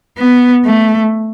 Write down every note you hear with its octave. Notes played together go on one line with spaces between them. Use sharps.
B3
A3